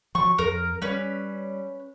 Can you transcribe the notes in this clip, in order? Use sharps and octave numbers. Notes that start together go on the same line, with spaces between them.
F3 F#3 C#6
F2 A#4
G3 C#4 B4